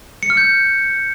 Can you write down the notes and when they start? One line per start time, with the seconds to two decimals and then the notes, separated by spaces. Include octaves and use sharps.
0.23 C#7
0.30 F6
0.37 G6